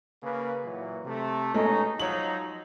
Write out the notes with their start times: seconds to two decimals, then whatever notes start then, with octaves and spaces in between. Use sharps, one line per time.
0.23 C#3 A#3 B4
0.64 A#2 E3 F#3
1.05 C3 A3
1.54 B2 G#3 A3 C#4 D#4
2.00 F3 F#3 D#4 C#5 F#7